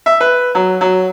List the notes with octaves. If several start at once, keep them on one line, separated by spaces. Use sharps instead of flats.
E5
B4
F#3
F#3